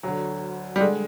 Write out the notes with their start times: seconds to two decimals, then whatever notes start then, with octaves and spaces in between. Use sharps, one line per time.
0.03 D2 D3 F#3
0.76 G3
0.81 D3 G#3